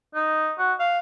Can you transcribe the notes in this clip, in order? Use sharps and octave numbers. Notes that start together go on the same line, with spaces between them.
D#4
F#4
F5